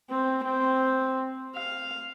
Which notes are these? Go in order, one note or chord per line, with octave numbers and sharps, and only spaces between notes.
C4
C4
F5